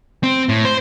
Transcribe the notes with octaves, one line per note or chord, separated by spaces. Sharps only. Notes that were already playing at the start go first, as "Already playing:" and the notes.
C4
A2
C5